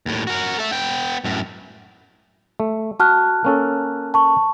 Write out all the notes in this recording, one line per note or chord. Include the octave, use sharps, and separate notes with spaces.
D#2 A2
F#4 A#4
A4 E5
B3 G5
F#2 A2
A3
F#4 A5 F6 F#6
A#3 C#4 A4
A5 C#6